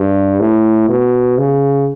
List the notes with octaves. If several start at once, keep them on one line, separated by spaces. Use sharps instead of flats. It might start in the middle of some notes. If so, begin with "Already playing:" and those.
Already playing: G2
A2
B2
C#3